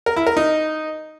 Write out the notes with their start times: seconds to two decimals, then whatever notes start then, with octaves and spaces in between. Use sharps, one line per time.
0.06 A#4
0.16 E4
0.27 A#4
0.37 D#4